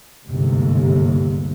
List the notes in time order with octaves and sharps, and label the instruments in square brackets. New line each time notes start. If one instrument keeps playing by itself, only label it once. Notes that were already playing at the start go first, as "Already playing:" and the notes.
[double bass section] G1 D#2 G#2 C3